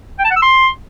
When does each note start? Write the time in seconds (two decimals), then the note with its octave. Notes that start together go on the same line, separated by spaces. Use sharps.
0.19 G5
0.25 A5
0.30 F#5
0.36 E6
0.42 C6